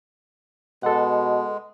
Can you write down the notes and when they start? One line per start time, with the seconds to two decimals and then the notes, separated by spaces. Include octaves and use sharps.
0.83 B2 G#3 A4 F#5